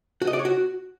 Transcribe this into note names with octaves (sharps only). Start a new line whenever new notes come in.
F#4
D#5
D5
C#5
F#4